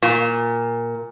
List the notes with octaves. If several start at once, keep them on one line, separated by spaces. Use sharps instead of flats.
A#2